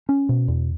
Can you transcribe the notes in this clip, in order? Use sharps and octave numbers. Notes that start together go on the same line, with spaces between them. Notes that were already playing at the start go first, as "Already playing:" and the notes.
C#4
B2
E2